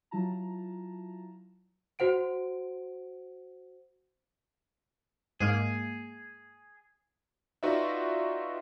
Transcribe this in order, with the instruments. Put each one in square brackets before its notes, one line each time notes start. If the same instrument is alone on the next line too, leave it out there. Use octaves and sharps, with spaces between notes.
[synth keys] F#3 E4 F4 A5 A#5
[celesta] F#4 C5 F#5 D7
[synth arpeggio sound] G#2 G#3 A#3 [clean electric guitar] G#4
[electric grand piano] D#4 F4 F#4 B4 D5 E5